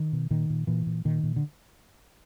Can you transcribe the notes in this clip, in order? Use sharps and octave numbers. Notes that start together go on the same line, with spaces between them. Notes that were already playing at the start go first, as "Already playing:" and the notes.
Already playing: D#3
B2
A#2 D#3
A#2
A#2 E3
A#2
A#2 D#3
A#2
D3